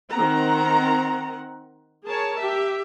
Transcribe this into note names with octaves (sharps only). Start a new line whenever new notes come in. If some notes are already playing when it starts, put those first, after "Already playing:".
D#3 C4 F#5 A#5
G#4 A#4 C#5 A5
G4 E5